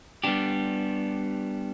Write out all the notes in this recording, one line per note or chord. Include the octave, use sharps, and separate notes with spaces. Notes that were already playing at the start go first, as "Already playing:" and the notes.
G3 B3 D4 G4